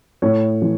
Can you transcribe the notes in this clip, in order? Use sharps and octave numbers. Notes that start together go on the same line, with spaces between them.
A2 C#5
E3